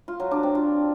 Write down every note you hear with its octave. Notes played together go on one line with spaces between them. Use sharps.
F4
F#3
D4
C4
F4